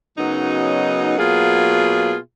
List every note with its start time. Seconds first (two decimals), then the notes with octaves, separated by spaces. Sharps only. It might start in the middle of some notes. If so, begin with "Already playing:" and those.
0.18 F#2 C#3 F#3 B3 D#4
1.18 B2 F#3 A#3 F4 G#4